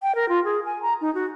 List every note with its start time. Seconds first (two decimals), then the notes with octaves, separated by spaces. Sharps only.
0.03 G5
0.15 A#4
0.29 F4
0.44 G#4
0.66 G#5
0.82 A#5
1.01 D#4
1.15 F#4